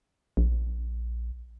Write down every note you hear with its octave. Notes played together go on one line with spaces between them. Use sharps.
A#1